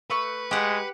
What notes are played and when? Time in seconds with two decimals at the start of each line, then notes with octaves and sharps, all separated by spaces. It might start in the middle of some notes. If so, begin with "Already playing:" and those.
0.10 A3 B4 C#6 F#6
0.51 G#3 G4 F#5